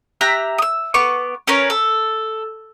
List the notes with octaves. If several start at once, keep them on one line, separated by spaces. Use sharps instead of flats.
G4 E5 A#5 F#6
D#6 E6
B3 C#6 D6
C#4 A#4 B4 C#5
A4